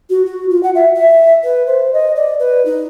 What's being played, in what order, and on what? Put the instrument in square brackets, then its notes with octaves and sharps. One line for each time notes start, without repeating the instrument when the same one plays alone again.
[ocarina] F#4
F#4
F4
F#5
E5
E5
B4
C5
D#5
D5
B4
D#4